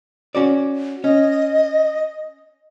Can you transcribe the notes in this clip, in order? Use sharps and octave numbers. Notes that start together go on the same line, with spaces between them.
C#4 F#4 D5
C#4 D#5